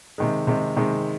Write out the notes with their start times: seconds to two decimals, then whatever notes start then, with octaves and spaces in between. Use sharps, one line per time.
0.18 C3 D#3 G#3
0.47 C3 D#3 G#3
0.76 C3 D#3 G#3